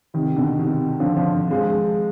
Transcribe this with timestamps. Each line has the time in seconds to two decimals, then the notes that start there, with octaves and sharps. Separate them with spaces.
0.14 C3 D#3
0.36 B2 D3
0.59 C3 D#3
1.00 D3 F3
1.17 D3 F3
1.51 F3 G#3